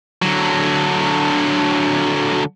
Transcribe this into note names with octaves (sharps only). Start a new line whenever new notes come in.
D3 F#3